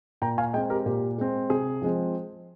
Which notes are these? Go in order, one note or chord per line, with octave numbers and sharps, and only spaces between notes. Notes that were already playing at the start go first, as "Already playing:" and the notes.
A#2 G5 A#5
F5 G#5
G#3 C4 D#5 G5
G4 A#4
A#2 G4
G#3 C4
C3 G#4
F3 G#3 C4